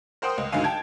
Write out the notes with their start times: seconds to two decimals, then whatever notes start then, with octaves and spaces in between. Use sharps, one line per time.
0.22 A#4 C5 F#5 G5 C6 D#6
0.38 C#2
0.52 C#2 G#2 D3 F#3 F5 G#5
0.64 G5 A5 G#6